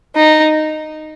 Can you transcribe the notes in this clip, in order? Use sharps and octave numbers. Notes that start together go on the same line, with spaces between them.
D#4